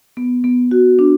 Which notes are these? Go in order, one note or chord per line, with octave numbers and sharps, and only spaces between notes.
B3
B3
F#4
D4